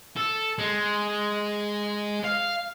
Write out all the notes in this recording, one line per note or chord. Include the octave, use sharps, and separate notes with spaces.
A4
G#3
F5